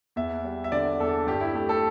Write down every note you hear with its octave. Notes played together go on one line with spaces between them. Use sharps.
E2 E5
G3
E5
D3 D5
E2 A4
G2 G4
E4
A3 G4
A4